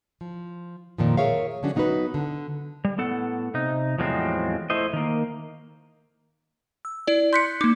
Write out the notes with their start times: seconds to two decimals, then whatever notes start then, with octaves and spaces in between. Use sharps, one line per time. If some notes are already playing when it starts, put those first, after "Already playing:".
0.21 F3
0.98 F2 A#2 D#3 F3
1.17 G#4 A#4 C#5 E5 F5
1.63 D3 F#3 C#4 D4 F#4
1.75 F#3 B3 D#4 F4 F#4 B4
2.14 D3
2.85 G3
2.98 A2 B3 A4 F#5
3.54 C3 D#4
3.98 E2 A2 F3 F#3 G#3 C4
4.70 A3 E4 C5 D#5
4.93 D#3 A#3
6.85 E6
7.07 E4 D5
7.33 C6 F#6 G6 B6 C#7
7.61 A#3 D#4 D6